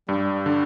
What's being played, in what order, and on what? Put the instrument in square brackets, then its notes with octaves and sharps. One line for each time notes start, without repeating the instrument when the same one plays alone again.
[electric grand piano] G2 [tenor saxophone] G3
[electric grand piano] D3